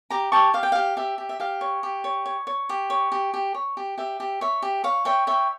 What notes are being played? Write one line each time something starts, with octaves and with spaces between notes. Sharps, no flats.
G4 A#5 D6
G4 A5 C#6
G4 F5
G5
G4 F5
G4 E5
G4
E5
G4 F5
C#5
G4
C#5
C#5
C#5
G4
C#5
G4
G4
C#5
G4
G4 E5
G4
C#5 E5
G4
C#5 F5
C#5 E5 G5
C#5 E5 G5